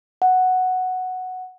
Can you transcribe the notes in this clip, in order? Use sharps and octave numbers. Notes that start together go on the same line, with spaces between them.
F#5